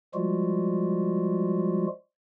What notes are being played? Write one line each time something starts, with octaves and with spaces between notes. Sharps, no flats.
F3 G3 G#3 F4 F#4